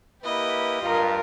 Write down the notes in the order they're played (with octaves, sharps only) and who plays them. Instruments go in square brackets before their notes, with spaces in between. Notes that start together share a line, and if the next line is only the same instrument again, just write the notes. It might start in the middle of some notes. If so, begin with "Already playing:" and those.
[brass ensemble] A#3 E4 B4 [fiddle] G4 D#5
[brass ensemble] G2 [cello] F4 A#4